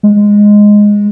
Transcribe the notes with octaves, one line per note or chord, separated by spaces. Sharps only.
G#3